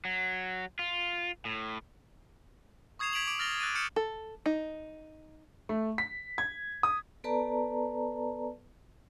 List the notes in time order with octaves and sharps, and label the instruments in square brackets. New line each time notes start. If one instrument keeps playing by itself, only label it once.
[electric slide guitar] F#3
F4
A2
[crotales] C#6 D#6 G#6 C7 E7 F7
G#6 B6 D7 F7 F#7
D6 D7
E6 F6 A6 A#6 F7 G7
E6 F#6 A6 A#6 D#7
D#6 F6 G6 C#7 E7
[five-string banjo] A4
D#4
[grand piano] A3
B6
G#6
D#6
[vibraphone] B3 A4 B4 D5 A5 A#5